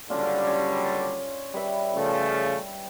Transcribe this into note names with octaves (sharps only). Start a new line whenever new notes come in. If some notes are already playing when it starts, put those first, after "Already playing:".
F#1 D3 G3 C#4 D4 F4
C#5 G#5
G3 B4 E5
C#3 F3 A3